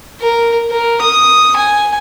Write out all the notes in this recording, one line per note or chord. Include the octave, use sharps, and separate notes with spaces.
A#4
A#4
D#6
G#5